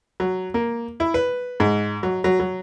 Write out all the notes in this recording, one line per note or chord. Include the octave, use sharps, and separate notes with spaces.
F#3
A#3
E4
B4
G#2
F#3
F#3
F#3